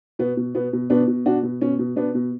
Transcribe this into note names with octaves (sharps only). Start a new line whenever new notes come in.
B2 B3
B2
B2 B3
B2
B2 B3 D4
B2
B2 D4 F#4
B2
B2 C#4
B2
B2 B3 D4
B2